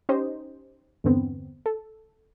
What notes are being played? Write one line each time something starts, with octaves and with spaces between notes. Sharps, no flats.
C#4 D#4 G4 C5 D#5
E2 G2 D3 B3 C4
A4